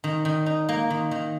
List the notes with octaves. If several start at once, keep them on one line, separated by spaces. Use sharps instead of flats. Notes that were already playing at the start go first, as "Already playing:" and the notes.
D#3
D#3
D#4
A#3
D#3
D#3